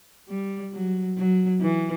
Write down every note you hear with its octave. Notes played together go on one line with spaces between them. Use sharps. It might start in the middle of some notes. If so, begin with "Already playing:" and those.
G3
F#3
F#3
E3